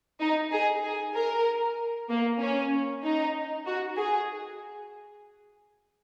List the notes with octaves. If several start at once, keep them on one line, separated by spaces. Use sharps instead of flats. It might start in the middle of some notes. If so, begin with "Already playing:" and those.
D#4
G#4
G#4
A#4
A#3
C#4
D#4
F#4
G#4